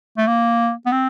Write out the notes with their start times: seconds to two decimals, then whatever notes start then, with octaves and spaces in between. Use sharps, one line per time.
0.18 A3
0.27 A#3
0.86 B3
0.92 C4